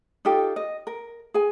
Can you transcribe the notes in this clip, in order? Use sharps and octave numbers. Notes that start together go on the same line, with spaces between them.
D#4 F4 G4 A4
D#5
A#4
G#4 G#5